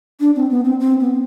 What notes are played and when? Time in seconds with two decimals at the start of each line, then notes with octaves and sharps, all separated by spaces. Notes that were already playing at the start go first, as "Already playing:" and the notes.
0.20 D4
0.36 C4
0.51 B3
0.65 C4
0.80 C4
1.01 B3